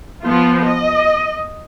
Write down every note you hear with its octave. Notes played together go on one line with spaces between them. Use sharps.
F3 B3 F4
D#5